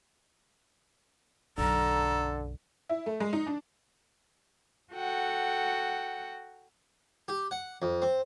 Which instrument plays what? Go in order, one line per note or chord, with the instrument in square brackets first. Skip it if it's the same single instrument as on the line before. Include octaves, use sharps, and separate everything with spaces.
[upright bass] B1 F#2 [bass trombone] D3 [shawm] A4 [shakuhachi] A#5
[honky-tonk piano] E4
A3
G#3
D#4
D4
[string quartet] F#4 A4 F#5 G5
[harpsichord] G4
F#5
F2
C4